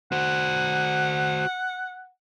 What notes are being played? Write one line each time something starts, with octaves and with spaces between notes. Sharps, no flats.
F#4 C5 F#5